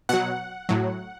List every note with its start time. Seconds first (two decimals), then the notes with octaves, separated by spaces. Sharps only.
0.09 B2 F#3 F#5
0.69 A2 F#3